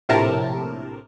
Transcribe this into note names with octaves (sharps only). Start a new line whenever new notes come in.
A#1 A2 C3 A#4 A5